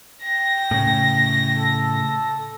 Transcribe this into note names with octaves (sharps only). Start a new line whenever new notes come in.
G5 A#6
A2 C#3
A4